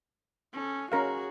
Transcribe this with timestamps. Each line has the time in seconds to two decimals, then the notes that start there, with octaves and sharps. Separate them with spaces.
0.53 C#4 A4
0.92 C#4 F#4 G#4 A#4 F5